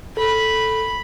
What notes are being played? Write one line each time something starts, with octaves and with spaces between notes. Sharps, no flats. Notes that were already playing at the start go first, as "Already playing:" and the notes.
A4 B5